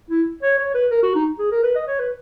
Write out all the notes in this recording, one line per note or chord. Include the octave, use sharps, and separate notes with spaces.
E4
C#5
C#5
B4
A#4
F#4
D#4
G#4
A#4
B4
D#5
C#5
B4